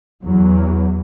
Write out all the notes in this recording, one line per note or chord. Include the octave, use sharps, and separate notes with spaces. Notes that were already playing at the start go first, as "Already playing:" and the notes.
E2 F#3